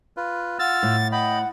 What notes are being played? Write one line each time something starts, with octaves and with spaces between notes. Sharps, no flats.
F4 B4
F4 F#5 E6 F6 A6
A2
D#5 F#5 G5 B5